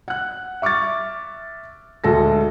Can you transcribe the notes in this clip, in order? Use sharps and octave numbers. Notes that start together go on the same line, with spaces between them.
F#5 F#6
E5 C#6 D6 F6 A6
D2 G#3 A4 A#6